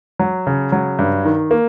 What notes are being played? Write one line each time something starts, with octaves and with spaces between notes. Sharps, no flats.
F#3
C#3
F#3
G2
D#3
A#3